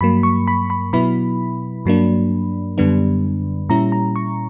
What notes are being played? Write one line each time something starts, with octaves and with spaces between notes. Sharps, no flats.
G2 F#3 A#3 B5
C#6
B5
B5
B2 F#3 B3 E4 B5
G2 F#3 A#3 D4
F#2 D3 G3 B3 D4
A#2 G3 C#4 E4 A#5
A#5
C#6